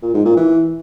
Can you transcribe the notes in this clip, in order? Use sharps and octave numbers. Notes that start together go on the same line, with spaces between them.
A#2
G#2
A#2
E3